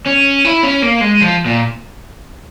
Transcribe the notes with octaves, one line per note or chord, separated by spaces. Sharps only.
C#4
E4
C#4
A#3
G#3
F3
A#2